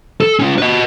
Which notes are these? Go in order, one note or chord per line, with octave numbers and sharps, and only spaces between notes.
A4
G#3 C#4
B4 D#5